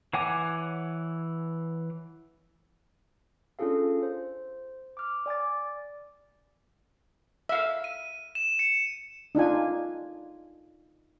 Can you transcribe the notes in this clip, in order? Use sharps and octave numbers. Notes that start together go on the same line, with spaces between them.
E3 C#5 F#5 G#5 D6
C#4 D4 F4 G#4 A4 F5
C5
D6 F6
D5 G#5 D6 A6
E5 F5
D#7
E7
C#7
D4 D#4 F4 G#5